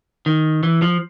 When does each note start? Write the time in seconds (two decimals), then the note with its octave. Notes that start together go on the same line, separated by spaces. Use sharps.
0.26 D#3
0.63 E3
0.82 F3